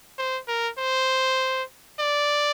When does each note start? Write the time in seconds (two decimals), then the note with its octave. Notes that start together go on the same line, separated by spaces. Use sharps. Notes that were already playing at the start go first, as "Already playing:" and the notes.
0.18 C5
0.48 A#4
0.78 C5
2.00 D5